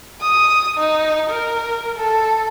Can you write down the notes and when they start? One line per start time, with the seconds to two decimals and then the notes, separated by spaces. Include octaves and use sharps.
0.22 D#6
0.78 D#4
1.30 A#4
1.96 A4